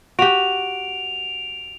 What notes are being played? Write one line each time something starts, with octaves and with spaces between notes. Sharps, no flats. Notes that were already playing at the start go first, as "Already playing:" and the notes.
F#4 G4 D7 F7